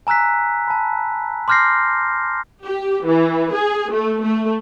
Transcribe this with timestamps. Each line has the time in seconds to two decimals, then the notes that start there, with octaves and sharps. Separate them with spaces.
0.07 G#5 A#5 E6 F#6 B6
0.68 A5 B5
1.48 C6 D6 F6 G6 A#6 C7
2.64 G4
3.06 E3
3.53 G#4
3.93 A3
4.22 A3